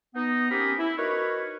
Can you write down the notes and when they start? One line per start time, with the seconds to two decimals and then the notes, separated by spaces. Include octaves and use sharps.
0.15 B3 D#4
0.51 C4 C#4 G4 G#4 A#4 B5
0.79 E4
0.98 D#4 F#4 A#4 B4 C#5